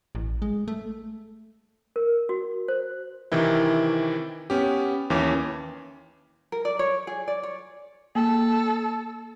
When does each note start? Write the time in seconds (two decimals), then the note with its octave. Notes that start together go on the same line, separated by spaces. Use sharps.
0.15 A1
0.42 G#3
0.68 A3
1.96 A#4
2.29 F#4
2.68 C5
3.32 C3 D#3 E3 E4
4.50 B3 C#4 G4
5.10 D#2 E3 C#4 D6
6.52 A#4
6.65 D5
6.79 C#5
7.07 G#4
7.28 D5
7.43 C#5
8.15 A#3 A4